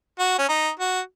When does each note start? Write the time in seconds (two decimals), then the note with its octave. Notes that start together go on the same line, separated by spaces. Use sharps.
0.19 F#4
0.38 C#4
0.49 D#4
0.79 F#4